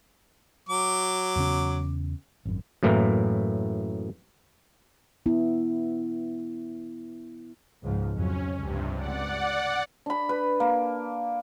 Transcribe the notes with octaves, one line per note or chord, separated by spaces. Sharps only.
F#3 D6
E2 C#3 C#4
G#1 F#2
F#2 A2 E3 A#3
B3 E4
C#2 G#2 F3
F2 F#3 C#4
C#2 G2 C3
D5 F#5
D4 B5
B4
A#3